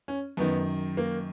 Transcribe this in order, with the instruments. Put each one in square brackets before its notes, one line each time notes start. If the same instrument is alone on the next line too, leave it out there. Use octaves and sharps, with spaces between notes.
[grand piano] C#4
F#2 D#3 B3
A#3